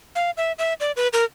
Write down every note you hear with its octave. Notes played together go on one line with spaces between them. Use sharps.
F5
E5
E5
D5
B4
A#4